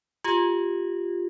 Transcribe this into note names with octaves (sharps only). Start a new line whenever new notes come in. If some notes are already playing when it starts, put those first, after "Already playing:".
F4 G4